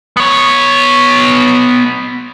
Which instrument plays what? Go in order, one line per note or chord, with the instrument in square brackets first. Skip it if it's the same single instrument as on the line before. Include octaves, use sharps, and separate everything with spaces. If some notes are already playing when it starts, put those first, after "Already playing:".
[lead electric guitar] B3 C#5